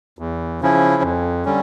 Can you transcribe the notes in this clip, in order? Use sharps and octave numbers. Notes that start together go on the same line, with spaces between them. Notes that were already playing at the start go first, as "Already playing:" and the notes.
E2
C#3 F3 C#4 E4
F2
D3 G3 C#4